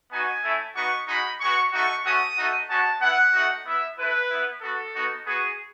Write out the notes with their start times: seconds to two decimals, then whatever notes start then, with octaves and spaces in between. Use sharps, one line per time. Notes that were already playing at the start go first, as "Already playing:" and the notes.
0.11 B3 D#4 F#4 G#5
0.44 A3 C#4 E4
0.76 B3 D#4 F#4 C#6
1.08 G#3 D#4 F#4 B5
1.40 G#3 B3 F#4 C#6
1.72 A3 D#4 F#4 C#6
2.04 A3 C#4 F#4 D#6
2.37 A3 D#4 F#4
2.68 G#3 C#4 F#4 A5
3.01 B3 E4 F#5
3.33 A3 D#4 F#4
3.65 B3 E4 E5
3.98 A3 E4 B4
4.29 B3 E4
4.61 B3 F#4 A4
4.94 B3 D#4 F#4
5.25 B3 F#4 G#4